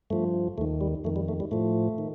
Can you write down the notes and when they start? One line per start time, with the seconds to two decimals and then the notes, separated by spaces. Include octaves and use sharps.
0.10 G2 F3 A3
0.58 D#2 D#3 A3
0.81 G3
1.04 F2 D#3 A3
1.16 G3
1.28 A3
1.40 G3
1.51 A2 F3 A3
1.98 D#3